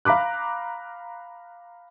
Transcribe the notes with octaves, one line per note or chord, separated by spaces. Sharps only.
F5 A#5 B5 D6 F#6